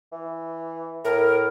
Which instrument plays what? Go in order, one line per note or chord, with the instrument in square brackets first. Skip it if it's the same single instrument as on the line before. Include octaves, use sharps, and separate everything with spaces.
[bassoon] E3
[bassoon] A2 [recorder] A#4